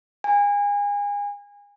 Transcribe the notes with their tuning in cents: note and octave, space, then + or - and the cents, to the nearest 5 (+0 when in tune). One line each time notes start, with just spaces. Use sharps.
G#5 -30